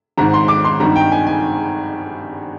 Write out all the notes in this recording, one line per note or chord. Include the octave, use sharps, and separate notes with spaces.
G#1 G#2 D#3 A#5
C6
D6
C6
G#1 G2 D#3 G3 A#5
G5
G#5
G#5